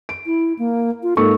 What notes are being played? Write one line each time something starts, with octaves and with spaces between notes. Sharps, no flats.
D7
E4
A#3
F4
G#2 A#3 A4 C#6